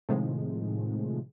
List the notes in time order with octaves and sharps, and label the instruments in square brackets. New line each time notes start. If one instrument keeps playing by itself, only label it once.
[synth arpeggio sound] A2 C3 D#3 F3 G#3